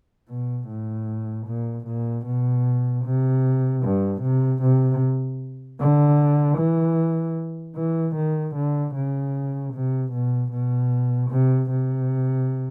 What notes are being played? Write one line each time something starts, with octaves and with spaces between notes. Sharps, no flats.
B2
A2
A#2
A#2
B2
C3
G2
C3
C3
D3
E3
E3
D#3
D3
C#3
C3
B2
B2
C3
C3